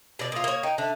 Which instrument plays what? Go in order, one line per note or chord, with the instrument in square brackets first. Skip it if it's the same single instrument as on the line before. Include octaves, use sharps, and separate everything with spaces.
[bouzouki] B2 D5
[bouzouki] A#2 F4 [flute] D#6
[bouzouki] A#3 C#5
[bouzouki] D#4 [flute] G5
[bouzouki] D3 D4 [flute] E5